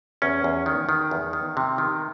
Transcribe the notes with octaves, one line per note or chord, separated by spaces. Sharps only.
E2 C#4
E2
D#3
D#3
E2
D#3
C3
D#3